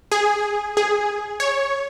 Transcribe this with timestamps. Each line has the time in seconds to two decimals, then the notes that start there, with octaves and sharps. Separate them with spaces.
0.12 G#4
0.77 G#4
1.40 C#5